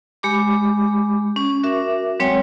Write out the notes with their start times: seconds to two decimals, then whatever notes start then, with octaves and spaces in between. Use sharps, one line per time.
0.23 G#3 G4 B5 D6
1.36 C#4
1.63 F#4 A#4 E5 D6
2.20 F#3 G#3 C4 C#5 G5